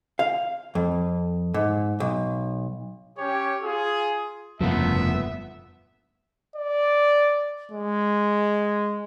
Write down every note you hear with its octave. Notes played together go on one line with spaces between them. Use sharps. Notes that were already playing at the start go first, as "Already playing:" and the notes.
F5
F2
G#2
B1
C#4 G4 C#5
F4 G#4
F1 G2 A#2 C#3 F3 A3 B3 E5
D5
G#3